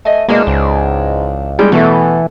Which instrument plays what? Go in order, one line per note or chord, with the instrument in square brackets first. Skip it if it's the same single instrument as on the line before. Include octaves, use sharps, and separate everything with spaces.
[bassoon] A3 [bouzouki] D#5 G#5
[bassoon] B2 [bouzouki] E3 D4 D#4 [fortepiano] G#3 [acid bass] A#3
[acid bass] C#2 [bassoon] G#2
[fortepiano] G3 G#3 [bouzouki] G5
[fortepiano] B2 A3 [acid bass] E3 [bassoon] B3 [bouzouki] A4